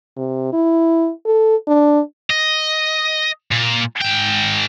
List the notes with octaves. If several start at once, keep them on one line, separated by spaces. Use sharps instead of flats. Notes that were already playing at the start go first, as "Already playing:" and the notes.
C3
E4
A4
D4
D#5
A#2
G#2 G5